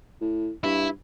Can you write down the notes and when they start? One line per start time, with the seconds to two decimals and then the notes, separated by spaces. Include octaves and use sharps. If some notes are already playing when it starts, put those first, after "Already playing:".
0.21 A2
0.64 G2 E4